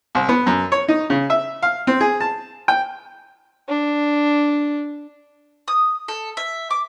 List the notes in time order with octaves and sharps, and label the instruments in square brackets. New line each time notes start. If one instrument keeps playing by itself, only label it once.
[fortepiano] C2
B3
F#2
C#5
D#4
C#3
E5
F5
C4
G#4
A5
G5
[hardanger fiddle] D4
[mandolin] D#6
A4
E5
D6